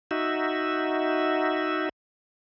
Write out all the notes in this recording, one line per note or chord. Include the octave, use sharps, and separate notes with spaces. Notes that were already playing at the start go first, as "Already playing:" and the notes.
D#4 F#4 E5